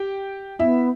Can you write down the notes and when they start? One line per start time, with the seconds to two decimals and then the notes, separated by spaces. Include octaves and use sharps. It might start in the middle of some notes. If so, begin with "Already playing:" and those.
Already playing: G4 G5
0.59 B3 E4 E5